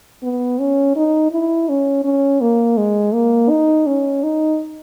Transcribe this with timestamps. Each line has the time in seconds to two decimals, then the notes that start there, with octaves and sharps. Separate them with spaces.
0.23 B3
0.60 C#4
0.96 D#4
1.32 E4
1.69 C#4
2.05 C#4
2.41 A#3
2.78 G#3
3.14 A#3
3.50 D#4
3.87 C#4
4.24 D#4